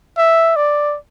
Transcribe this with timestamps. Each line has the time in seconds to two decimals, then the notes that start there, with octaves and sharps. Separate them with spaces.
0.17 E5
0.56 D5